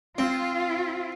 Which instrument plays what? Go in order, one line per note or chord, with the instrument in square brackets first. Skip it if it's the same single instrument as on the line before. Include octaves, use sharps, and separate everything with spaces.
[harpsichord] C4 [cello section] F4